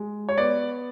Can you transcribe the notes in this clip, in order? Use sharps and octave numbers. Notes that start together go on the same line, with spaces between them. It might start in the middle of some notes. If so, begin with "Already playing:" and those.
Already playing: G#3
C#5
B3 D5